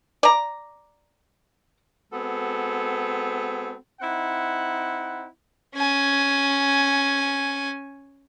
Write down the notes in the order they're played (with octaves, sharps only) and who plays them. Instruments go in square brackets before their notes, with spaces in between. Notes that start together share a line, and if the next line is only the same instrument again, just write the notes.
[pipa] D5 A#5
[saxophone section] G#3 B3 C4 F#4 A4
[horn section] C4 D#4 E4 F#5
[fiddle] C#4 G#5